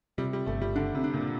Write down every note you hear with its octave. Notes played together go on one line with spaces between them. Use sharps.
C3 G3
G3
G1 A3
G3
D3 D4
C3
D4
A#2